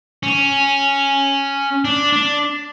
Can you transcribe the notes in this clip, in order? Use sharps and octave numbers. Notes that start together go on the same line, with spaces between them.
C#4
D4
D4